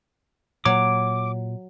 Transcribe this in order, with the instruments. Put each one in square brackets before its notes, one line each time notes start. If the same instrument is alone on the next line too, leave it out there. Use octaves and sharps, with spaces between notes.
[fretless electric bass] A#2 [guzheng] F#3 [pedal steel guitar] D6